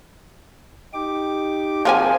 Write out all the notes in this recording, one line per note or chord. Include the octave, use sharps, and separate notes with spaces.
D#4 G4 D6
F3 C4 G#4 A#4 C5 G#5